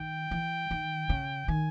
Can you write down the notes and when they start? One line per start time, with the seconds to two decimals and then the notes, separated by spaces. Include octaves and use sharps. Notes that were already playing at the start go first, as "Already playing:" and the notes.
Already playing: D#3 G5
0.31 E3
0.71 D#3
1.10 C#3
1.48 D#3 G#5